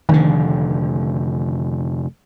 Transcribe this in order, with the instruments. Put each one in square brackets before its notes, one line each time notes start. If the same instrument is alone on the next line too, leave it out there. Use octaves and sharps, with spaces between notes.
[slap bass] F1 D3 [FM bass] D#3